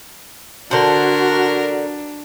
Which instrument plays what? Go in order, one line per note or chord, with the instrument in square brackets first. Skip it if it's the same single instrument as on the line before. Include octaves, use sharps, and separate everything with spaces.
[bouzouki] D3 C5 [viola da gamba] D4 [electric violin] F#4 [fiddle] A#4